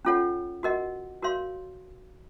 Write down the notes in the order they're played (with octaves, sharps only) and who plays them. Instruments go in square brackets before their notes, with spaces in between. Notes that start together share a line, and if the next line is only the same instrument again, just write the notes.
[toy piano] C#4 F4 A4 C#5 F#5
F#4 A#4 D#5 F#5
F#4 A#4 C#5 F5 C6